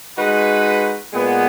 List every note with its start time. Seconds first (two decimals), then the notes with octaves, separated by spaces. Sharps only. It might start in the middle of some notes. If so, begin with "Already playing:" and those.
0.17 G#3 D#4 F#4 B4
1.13 A#2 G#3 B3